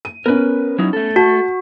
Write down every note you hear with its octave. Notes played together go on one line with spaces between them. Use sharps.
D#7
B3 C#4 A#4 B4
F#3 D#4 E4
A3 A4
F#4 A5